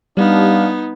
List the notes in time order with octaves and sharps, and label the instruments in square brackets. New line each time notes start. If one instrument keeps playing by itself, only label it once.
[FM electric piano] G3 [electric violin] B3 D#4 [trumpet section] D4 F5